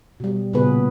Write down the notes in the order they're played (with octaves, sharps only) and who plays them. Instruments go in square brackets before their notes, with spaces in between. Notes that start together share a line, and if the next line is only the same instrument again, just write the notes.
[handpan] B2 G3
A#2 C#3 B3 G#4 B4